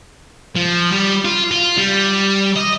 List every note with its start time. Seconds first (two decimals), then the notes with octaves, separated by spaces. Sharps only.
0.56 F3
0.92 G3
1.25 F4
1.51 F4
1.77 G3
2.56 D#5